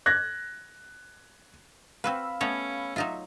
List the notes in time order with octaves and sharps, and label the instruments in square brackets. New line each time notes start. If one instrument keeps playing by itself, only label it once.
[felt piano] F#6 G#6 A#6
[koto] C4 F#4 B4 [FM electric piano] F5 B5 E6
[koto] A3 B3 C#5 [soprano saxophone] C#4
[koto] F#3 D#4 F4 [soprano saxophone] E5